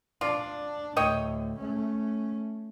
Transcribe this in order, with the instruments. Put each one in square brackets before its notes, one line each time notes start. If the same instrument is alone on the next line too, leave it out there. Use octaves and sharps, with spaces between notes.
[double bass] D4 [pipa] F4 D5
[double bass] D2 A2 [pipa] C#5 D#5 G5
[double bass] A3 C#4